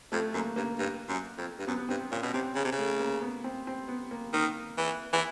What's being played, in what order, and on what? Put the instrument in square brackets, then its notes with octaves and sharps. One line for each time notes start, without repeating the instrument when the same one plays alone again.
[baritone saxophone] F2 [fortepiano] A3
[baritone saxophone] F#2 [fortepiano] A#3
[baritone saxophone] G2 [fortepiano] A#3
[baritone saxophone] G2
F#2
F2
G2
[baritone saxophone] F#2 [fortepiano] B3
[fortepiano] B3
[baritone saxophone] G2 [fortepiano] C4
[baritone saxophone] A#2 [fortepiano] C#4
[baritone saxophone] B2
[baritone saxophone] C3 [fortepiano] C4
[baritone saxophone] C#3
C3
C#3
[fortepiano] A3
A#3
B3
C4
C4
B3
A#3
[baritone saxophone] D#3 [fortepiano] A#3
[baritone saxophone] E3
E3